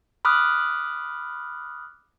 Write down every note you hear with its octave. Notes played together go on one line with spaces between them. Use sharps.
B5 D6 D#6 F6 F#6